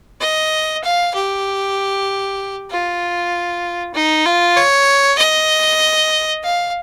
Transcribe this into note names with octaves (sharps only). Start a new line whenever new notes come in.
D#5
F5
G4
F4
D#4
F4
C#5
D#5
F5